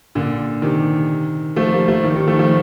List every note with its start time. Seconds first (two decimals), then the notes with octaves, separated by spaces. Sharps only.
0.15 A#2 D3
0.62 C3 D#3
1.56 F3 A3
1.72 G3 A#3
1.88 F3 A3
2.04 D#3 G3
2.16 D#3 G3
2.28 F3 A3
2.39 F3 A3